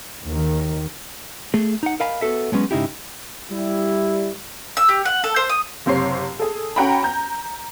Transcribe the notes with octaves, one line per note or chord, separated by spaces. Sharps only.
D#2 D#3
A3 G#4
D#4 F#5
A#4 D#5 F5 G#5 B5
B3 F#4 A4 E5
F#3 G#3 B3 C#4
G#2 C#3 D#4 E4 G4
G3 E4
E6
G4
F#5
A4
C5
D#6
F#1 C3 C5 C#5 C7
G#4 A4
C#4 F#4 F#5 G5 A#5 B5
A#5 G6